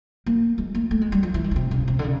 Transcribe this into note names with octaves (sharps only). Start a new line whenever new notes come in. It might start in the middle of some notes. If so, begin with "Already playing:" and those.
A#3
G#3
A#3
A3
G#3
G3
F3
E3
D#3
C#3
C3
C#3
C3
D3
C#3